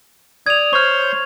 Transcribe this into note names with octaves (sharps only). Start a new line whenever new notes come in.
D5 D#6 G#6 F7
C5 C#5 C6 C#6 F6